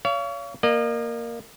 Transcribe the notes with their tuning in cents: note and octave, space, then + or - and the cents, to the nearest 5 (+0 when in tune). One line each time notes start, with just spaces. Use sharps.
C#5 +35 F5 -30
A#3 +0 D#5 -40